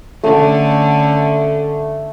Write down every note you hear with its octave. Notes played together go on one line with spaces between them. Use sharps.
D3 A3 C#4